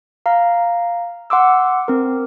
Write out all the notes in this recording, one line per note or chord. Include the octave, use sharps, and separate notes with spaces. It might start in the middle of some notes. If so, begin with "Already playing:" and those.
F5 A#5
F#5 C6 D6 E6
C4 A#4